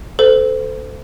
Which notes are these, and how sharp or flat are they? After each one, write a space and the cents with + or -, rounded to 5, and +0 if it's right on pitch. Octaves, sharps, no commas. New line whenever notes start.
A4 -5 C5 -30